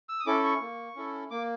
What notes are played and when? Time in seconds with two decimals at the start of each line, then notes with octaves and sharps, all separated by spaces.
0.09 E6
0.20 D#6
0.26 C#4 E4 A4 D6
0.44 C#6
0.61 A#3
0.96 C#4 E4 A4
1.31 A#3 D6